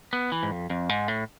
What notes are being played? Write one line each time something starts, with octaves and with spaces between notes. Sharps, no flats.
B3
E3
G#2
F2
F2
G#2
A2